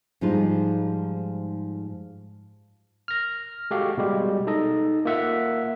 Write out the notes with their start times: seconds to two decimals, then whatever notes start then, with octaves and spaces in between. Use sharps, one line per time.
0.21 G#2 F3 G3 G#3 D#4 F4
3.08 F6 A#6
3.71 G#3 F#4 G4 A4 F5
3.97 B2 G3 G#3 G4
4.47 D#4 A4 D#5
5.05 A#3 F4 E5 F#5